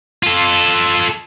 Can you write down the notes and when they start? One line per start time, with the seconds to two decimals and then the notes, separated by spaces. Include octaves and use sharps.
0.23 F4 A4